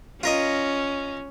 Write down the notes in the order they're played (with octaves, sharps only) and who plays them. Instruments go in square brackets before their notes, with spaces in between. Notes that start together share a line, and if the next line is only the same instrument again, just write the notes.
[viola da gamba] C#4 [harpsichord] F4 A#4 D#5